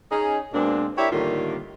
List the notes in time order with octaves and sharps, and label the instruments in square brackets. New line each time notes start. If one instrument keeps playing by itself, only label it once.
[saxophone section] C#4 D#4 G#4
B2 G#3 A#3 C4 D4
E4 G4 A#4 C#5 D5 E5
A2 D3 D#3 G3 A#3 F4